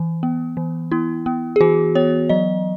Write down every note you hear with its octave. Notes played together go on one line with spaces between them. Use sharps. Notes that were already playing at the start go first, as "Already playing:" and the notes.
Already playing: E3
B3
E3
B3 E4
B3
G#4
E3 F#4
B3 C#5
F#3 D#5